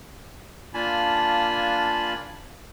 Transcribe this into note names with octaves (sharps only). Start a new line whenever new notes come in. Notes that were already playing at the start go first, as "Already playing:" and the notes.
A#3 D4 F4 G#5 A5 B5